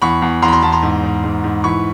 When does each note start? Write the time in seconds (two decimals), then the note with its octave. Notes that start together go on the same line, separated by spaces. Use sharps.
0.02 E2 B5 C#6
0.22 E2
0.42 E2 A#5 C6
0.48 B5
0.52 A#5 C6
0.62 E2 A5 B5
0.72 A#5 C6
0.82 G#2
1.04 G#2
1.24 G#2
1.44 G#2
1.64 E3 B5 C#6